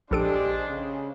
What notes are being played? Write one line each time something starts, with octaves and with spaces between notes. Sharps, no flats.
A#1 G#3 D4 G4 A4 C5 D7
C#3